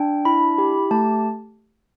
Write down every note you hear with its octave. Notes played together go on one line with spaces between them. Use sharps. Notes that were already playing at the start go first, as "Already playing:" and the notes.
Already playing: D4 G5
E4 B5
G4
A3 A5